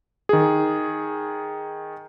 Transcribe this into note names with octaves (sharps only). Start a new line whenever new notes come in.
D#3 G#4